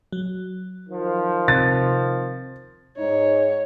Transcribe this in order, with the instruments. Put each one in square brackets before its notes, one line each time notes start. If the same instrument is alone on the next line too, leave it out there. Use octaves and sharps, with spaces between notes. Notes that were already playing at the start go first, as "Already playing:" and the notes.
[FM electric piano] F#3
[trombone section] D#3 F3
[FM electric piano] C3 [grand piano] A6
[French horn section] G#2 D#4 [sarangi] C#5